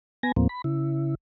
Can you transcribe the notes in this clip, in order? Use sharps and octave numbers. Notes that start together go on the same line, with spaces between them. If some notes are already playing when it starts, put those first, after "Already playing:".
B3 G#5 A#6
D#2 A2 F3 A#3 C4
B5
C#3 E4